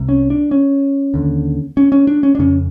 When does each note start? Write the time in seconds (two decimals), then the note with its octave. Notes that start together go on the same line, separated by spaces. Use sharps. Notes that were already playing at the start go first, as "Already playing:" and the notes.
Already playing: C2 C3
0.09 C#4
0.30 D4
0.51 C#4
1.14 D#2 D3
1.77 C#4
1.92 C#4
2.07 D4
2.23 C#4
2.35 D4
2.39 F2 C#3 C#4